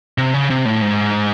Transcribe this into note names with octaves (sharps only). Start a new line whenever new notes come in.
C3
C#3
C3
A2
G#2